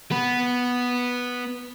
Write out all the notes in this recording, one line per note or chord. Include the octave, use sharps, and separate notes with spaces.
B3 B4